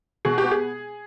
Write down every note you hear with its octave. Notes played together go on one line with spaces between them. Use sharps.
B2 G#4
G4
B3
G#4